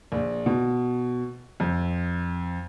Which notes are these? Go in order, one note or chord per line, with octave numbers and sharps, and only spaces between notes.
A#1
B2
F2